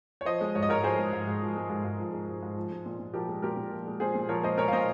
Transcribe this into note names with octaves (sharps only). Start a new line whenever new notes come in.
C#5
F3 C5 D#5
G#3
G#2 C#5
D#5
G#2 A#4 C#5
F3 G#4 C5
G#3
G#2
G#2
F3
G#3
G#2
G#2
F3
G#3
G#2
G#2
F3
G#3
A#2
A#2
F3 G4 A#4
G#3
A#2 G4 A#4
A#2
F3
G#3
A#2 G#4 C5
A#2
F3 A#4 C#5
G#3 C5 D#5
A#2 A#4 C#5
F5
A#2 C5 D#5